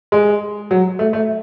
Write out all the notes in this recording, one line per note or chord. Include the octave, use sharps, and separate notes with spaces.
G#3
F#3
A3
A3